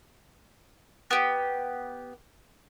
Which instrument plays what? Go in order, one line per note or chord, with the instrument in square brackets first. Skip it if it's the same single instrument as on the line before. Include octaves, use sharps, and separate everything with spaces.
[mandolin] B3 G4